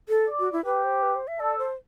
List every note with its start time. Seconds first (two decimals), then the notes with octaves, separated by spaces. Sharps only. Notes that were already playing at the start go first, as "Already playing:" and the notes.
0.09 A4
0.27 D5
0.40 F#4
0.52 E4
0.65 G4 B4
0.84 C5
1.02 B4
1.15 C5
1.28 E5
1.40 A4 D5
1.59 C5